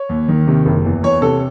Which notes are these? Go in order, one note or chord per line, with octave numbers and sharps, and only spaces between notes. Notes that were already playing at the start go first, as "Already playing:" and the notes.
Already playing: C#5
D#2
D#3
C3
F#1
E2
E2 C#5
C3 A4